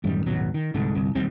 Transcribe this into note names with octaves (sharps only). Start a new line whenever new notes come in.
A1 F#2 D#3 G3
D#1 G#1 B2 F#3
D#3
C2 G#2 D3
G1 C2
E1 D#2 G3 C4